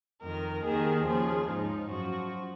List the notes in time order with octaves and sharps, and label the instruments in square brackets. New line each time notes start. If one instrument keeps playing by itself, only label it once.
[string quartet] F2 D#3 A#4
D#2 D#3 G#4
D#2 C#3 F3 G#4
G#2 F3 D#4
F#2 F3 F#4